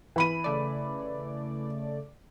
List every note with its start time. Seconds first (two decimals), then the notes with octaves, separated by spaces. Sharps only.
0.16 E3 B5 D#7
0.44 C#3 A3 D5